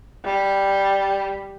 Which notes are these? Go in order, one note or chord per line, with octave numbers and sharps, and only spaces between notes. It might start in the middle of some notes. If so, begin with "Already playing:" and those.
G3